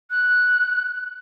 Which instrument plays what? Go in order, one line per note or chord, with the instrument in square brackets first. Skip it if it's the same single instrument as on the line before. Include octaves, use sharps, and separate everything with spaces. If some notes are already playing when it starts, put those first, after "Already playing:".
[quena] F#6